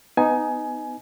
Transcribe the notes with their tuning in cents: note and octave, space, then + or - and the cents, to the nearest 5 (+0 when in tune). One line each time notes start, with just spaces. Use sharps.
B3 +25 D#4 +0 G#5 +20